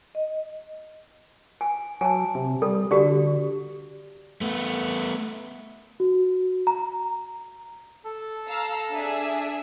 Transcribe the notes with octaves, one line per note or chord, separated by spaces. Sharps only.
D#5
G#5
F#3 G#5 A5
C3
G3 A4
D3 F#4 G4 D5
A3 B3
F#4
A#5
A4
F5 A#5 E6
D4 G#4 E5